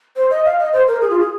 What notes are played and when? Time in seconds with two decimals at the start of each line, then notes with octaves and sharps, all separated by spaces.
0.16 C5
0.30 D#5
0.45 F5
0.59 D#5
0.73 C5
0.87 A#4
1.01 G#4
1.10 F4
1.20 G#4